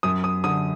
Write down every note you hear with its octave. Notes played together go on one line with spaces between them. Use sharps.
F#2 D#6
D#6
D3 D#6